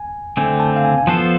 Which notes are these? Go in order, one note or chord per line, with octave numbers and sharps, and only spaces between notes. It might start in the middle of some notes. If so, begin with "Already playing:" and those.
Already playing: G#5
D3 A3 C4 G#5
A5
F5
G#5
G#5
F3 B3 F4 A4 C5 A5